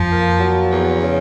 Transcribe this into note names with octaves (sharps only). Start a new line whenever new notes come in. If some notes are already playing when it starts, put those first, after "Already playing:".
Already playing: F2 F3
A#3
F#3
E2
C#3